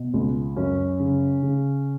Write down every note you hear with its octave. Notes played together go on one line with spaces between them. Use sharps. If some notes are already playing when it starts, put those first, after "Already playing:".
Already playing: B2
C#2
F#2 C#4
C#3
C#3